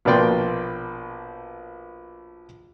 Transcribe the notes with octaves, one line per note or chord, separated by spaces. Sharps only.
A#1 B2 A#3 D5 G5 C6